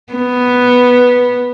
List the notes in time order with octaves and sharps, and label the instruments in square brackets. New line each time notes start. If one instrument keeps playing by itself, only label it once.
[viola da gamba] B3